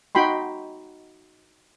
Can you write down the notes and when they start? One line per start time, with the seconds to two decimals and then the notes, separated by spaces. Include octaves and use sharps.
0.15 D#4 F#4 G5 B5 C6